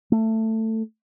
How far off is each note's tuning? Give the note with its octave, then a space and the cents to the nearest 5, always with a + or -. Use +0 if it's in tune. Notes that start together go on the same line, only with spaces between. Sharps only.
A3 +15